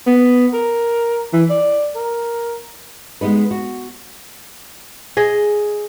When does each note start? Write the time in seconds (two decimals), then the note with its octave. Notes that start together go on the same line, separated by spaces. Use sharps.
0.07 B3
0.54 A#4
1.33 E3
1.50 D5
1.96 A#4
3.21 G#3 B3 D#4 B4
3.51 F#4
5.17 G#4 D#5